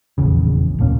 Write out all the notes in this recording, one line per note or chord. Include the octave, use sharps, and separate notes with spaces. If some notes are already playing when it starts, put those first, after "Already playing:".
F1 A#1 E2 C#3
D1 A#1 A#3 C#4